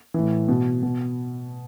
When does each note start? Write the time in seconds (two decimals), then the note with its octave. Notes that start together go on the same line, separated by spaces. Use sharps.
0.14 A2 E3
0.48 B2
0.83 B2